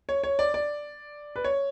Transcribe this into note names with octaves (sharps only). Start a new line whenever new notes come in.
C#5
C#5
D5
D5
B4
C#5